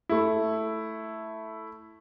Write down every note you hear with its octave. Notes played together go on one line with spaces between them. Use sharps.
A3 E4